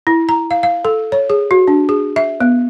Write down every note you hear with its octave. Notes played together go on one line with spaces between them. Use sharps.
E4
A#5
F5
F5
A4
C#5
G#4
F#4
D4
G#4
E5
B3